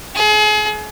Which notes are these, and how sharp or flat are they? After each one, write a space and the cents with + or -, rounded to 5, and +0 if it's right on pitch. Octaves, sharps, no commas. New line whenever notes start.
G#4 +35